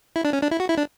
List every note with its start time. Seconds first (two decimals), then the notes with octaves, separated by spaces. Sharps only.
0.16 E4
0.25 D4
0.33 C#4
0.42 D4
0.51 E4
0.60 F#4
0.69 E4
0.78 D4